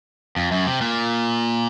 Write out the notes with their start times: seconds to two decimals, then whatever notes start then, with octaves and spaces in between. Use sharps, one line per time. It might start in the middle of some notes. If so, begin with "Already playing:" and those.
0.36 F2
0.51 F#2
0.67 C3
0.81 A#2